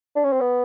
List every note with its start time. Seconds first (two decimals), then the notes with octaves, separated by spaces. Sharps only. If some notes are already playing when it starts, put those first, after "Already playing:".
0.16 D4
0.24 C#4
0.32 C4
0.41 B3